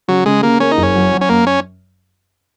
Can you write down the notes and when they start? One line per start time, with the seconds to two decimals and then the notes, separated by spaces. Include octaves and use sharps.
0.08 C#3 F#3
0.26 C#3 G#3
0.43 C#3 A#3
0.60 A#3 C#4
0.71 D#4
0.77 F#1
0.83 C#4
0.95 F#3
1.12 F#3
1.21 C#4
1.29 F#2 A#3
1.47 C#4